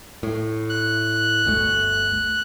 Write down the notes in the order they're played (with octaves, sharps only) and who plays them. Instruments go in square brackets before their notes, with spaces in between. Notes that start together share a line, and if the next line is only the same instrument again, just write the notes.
[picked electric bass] A2
[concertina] F#6
[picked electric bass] G1 D2 A3